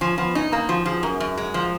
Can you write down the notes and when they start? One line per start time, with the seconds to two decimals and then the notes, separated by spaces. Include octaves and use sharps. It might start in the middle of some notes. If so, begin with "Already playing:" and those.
0.01 F3 C#4
0.18 F3 B3
0.35 C#4 D#4
0.52 A#3 D#4
0.69 F3 F#4
0.86 F3 G#4
1.03 F#2 A#4
1.20 F#2
1.38 G#3
1.54 F3 F5